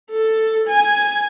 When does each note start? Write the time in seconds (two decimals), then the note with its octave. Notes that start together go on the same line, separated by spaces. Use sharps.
0.11 A4
0.68 G#5